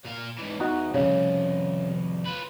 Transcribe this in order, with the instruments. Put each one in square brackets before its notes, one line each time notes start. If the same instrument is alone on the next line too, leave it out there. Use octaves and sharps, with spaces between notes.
[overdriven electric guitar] A#2 F5
G#2 E3
[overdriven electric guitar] E2 [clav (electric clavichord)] D#4 F#4
[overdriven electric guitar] C2 F2 [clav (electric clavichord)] C#3
[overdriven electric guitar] F4 B4